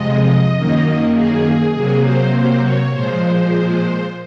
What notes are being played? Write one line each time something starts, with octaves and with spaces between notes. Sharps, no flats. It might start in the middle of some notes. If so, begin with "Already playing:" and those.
Already playing: F2 C3 F3 G#3 D#5
F#2 D#3 A#3
G#4
C3 F#3 A#3 G#4
C5
C5
C#5
A#2 F3 G#3 C5